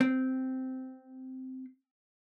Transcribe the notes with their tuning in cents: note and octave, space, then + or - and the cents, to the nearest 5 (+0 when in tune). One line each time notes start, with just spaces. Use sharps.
C4 -10